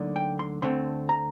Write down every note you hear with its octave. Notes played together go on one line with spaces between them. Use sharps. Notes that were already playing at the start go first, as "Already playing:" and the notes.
Already playing: D2 D3 F#3 A#3 D#4
G5
C6
D2 D3 A3 C4 C6
A#5